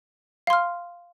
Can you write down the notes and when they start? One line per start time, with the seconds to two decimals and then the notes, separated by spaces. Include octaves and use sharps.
0.47 F5
0.50 C6
0.53 F6